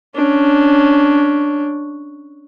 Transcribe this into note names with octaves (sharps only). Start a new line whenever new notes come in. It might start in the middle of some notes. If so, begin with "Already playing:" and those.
C#4 D4